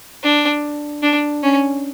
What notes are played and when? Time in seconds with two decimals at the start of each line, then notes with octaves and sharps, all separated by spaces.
0.23 D4
1.03 D4
1.43 C#4